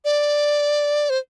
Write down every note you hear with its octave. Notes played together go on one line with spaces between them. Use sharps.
D5
C5